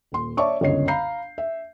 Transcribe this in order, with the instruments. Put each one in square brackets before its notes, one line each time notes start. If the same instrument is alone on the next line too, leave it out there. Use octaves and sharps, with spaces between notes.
[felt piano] D#1 C6
C#5 D5 E5 A5 C#6 D6
G1 C#2 F#2 C#5 D#5 C7
F5 A#5 B5 G6 C7
E5